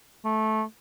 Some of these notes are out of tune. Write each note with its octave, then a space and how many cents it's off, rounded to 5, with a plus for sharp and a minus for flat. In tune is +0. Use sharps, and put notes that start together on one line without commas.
A3 -15